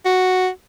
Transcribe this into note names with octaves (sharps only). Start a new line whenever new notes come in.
F#4